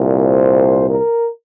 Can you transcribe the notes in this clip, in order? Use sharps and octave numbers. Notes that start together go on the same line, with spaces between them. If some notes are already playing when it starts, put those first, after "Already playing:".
Already playing: C2 A#2
C5
A#4